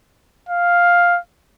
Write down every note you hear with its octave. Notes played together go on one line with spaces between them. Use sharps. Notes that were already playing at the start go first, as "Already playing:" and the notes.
F5